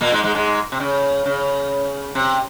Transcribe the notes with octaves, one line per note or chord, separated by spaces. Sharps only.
A#2 A#3
G#2 G#3
G#2 G#3
G#2 G#3
C3
C#3
C#3
C3